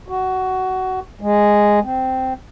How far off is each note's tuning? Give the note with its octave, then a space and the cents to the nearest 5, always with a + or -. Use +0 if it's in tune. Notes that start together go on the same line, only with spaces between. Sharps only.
F#4 +15
G#3 -5
C4 -10